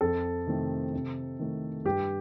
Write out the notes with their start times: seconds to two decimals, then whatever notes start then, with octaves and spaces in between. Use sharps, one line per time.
0.01 F2 A4
0.47 C3 D#3 A3 C4
0.94 C3
1.39 D#3 A3
1.85 G2 G4